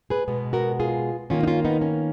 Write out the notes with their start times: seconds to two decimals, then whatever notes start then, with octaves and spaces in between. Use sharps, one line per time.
0.10 G#4 B4
0.28 B2 G#3 B3
0.53 F#4 A#4
0.80 F4 G#4
1.30 D#3 A#3 C#4 F4
1.43 D#4
1.47 C#4 F4
1.65 B3 D#4
1.82 C#4